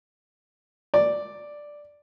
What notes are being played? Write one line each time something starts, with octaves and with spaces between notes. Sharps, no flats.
D5